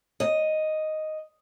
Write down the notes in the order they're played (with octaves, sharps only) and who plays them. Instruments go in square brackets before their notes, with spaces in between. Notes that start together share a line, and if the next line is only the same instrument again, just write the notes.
[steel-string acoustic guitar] D#5